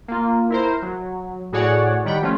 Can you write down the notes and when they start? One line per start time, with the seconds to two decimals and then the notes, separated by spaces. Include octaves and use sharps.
0.08 A#3 F4
0.50 E4 A#4 C5
0.82 F#3
1.52 A2 F#4 G#4 C#5 D5 F#5
2.05 D#3 G3 F#5 G5 B5
2.22 F3 A3 C#4 F4